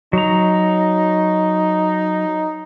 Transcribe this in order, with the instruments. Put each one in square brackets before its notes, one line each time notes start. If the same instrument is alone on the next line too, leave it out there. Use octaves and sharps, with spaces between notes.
[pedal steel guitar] F#3 A#5 [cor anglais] D#4